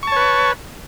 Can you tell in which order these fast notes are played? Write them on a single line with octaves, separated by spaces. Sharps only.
C#6 A5 C#5 B4